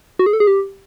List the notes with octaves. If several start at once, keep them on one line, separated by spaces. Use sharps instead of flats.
F#4
G#4
A4
G#4
G4